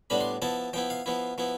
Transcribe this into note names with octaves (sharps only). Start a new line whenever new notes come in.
A2 G3 B3 D4 B5
C6
F3 B3 E4 A5
F3 B3 E4 G5
F5
F3 B3 E4
F3 B3 E4